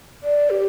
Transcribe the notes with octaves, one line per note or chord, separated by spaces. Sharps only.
D5
G4